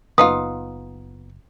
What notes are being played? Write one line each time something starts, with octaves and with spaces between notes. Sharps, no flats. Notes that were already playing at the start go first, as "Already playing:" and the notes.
F#1 B3 D#4 F4 D#6